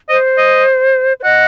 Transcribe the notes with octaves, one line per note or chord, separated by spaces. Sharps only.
C5 D#5
D#5
C5
D#5 F#5